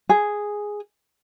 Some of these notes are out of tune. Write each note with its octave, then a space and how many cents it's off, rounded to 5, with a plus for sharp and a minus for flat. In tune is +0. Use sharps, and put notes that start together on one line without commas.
G#4 +0